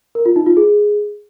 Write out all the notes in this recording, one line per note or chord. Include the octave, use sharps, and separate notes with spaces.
A#4
F4
D#4
F4
G#4